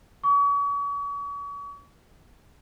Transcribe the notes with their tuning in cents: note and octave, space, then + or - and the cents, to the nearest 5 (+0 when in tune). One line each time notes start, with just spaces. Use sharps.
C#6 +40